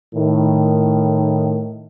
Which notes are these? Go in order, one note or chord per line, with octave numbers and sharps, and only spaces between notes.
A2 D#3